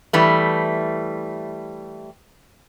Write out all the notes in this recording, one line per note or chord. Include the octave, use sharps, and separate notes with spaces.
E3 G3 A3